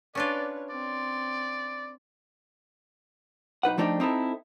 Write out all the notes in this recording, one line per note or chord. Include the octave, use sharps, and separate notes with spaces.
C#4 D4 F4 B4 C#5 D5
C4 D5 C6
B1 D#4 B4 F#5
F3 A3 D4 D#4 F#4 G4
C4 D#4 E4 A4